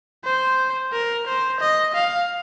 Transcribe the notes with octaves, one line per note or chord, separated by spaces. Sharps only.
C5
A#4
C5
D#5
F5